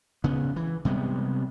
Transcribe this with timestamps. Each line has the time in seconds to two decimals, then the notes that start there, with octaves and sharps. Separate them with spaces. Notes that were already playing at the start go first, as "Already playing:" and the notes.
0.24 C#3 B3
0.56 E3
0.85 C3 G3 G#3 B3